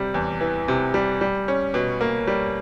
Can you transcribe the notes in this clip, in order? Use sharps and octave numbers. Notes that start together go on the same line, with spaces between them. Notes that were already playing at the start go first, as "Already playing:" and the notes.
Already playing: C3 G3
E2
E3
C3
G3
G3
C#4
B2
A#3
G3